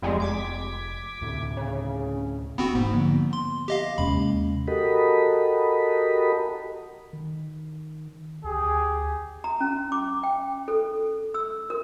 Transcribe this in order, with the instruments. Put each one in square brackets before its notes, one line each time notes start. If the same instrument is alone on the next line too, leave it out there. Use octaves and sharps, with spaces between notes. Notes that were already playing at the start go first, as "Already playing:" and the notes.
[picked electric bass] F1 [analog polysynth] F2 G3 G#3
[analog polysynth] D6 G#6 B6
[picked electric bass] D2 A2 C3
[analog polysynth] C#3
[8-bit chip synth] B3 C4 F#4 [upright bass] D4 [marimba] B5
[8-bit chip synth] G#2 [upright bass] A#3 E4
[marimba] D3 F3 B3
[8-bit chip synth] C6
G4 D#5 F5
[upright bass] D#2 [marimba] C3 G#3 C#4 [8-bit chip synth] B5
[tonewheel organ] F#4 G4 A4 A#4 D#5 B5
[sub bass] D#3
[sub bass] D2 [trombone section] G4 G#4
[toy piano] A#5
C#4
D6
G5
A4
E6
A#4